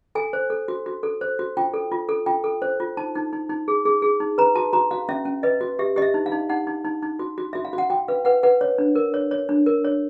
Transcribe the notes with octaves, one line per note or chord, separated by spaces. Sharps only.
A4 G#5
C5
A4
F#4
F#4
A4
C5
F#4
F4 G5
A4
F4
A4
F4 G5
A4
C5
F4
D#4 A5
D#4
D#4
D#4
G#4
G#4
G#4
D#4
B4 A#5
F#4 A5
F#4 A#5
F#4 F5
C#4 E5
C#4
B4 D#5
F#4
G4 E5
G4 D#5
E5
D#4
F5
D#4
D#4 F#5
D#4
D#4
D#4
F#4
F#4
F#4 E5
F5
F#4
F#5
F#4 G5
B4 F5
B4 F#5
B4 F#5
C#5
D4
A#4
C#5
C#5
D4
A#4
C#5